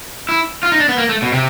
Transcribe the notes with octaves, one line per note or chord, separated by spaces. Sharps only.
E4
F4
D#4
D4
B3
A#3
A3
B2
C3